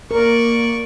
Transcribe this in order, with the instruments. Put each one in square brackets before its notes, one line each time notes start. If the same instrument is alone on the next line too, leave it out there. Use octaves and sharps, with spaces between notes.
[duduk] A#3 [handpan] A#4 [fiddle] D5 C#6